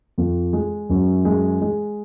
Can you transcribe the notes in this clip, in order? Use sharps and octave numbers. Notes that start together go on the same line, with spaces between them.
F2
G#3
F#2
G#3
G#3